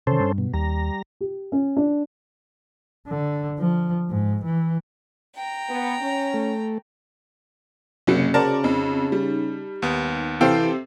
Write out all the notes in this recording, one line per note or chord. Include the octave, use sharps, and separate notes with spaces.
C3 D#3 C#4 A4 C5
G2
B2
D#2 G3 A#5
G4
C#4
D4
D3
F3
G#2
E3
G5 A#5
B3
C#4
A3
F#1 C3 F#3 A#3 C#4 C#7
C#3 F#4 G#4 A#4 C5 D5 A5
F2 D#4
G3
D#2 B3
C3 E3 A4 C5 F5 G5 C7